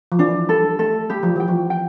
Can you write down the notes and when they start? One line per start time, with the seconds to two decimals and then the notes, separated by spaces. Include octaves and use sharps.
0.12 F3
0.19 E3 D4
0.49 G3 A4
0.79 A3 A4
1.10 G3 G4
1.23 F3
1.36 E3 G5
1.48 F3
1.70 G5